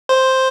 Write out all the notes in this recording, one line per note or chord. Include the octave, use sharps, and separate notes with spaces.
C5